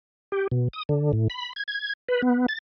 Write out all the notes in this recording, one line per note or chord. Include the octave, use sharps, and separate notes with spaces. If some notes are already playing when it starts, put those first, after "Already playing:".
G4
B2
D#6
D3
A2
B5
G#6
G#6
B4
B3
A6